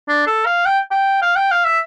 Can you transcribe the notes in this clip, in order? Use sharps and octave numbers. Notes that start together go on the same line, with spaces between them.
D4
A4
F5
G5
G5
F5
G5
F5
E5